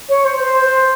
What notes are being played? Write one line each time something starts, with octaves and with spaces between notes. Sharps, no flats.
C#5
C5
C5
C5